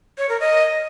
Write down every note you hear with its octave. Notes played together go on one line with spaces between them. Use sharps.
C#5
A#4
D#5